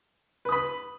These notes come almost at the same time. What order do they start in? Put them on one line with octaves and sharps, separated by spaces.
B4 D#6 B5